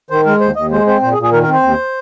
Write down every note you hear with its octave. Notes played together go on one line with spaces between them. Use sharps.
D#3 C5
G#3 A#4
D#2 C5
D#2 D#5
G#3 C5
C4 C5
A#2 C5
G#4
A#2
G#4
D#3 A#4
A#4
C4
C5
D#2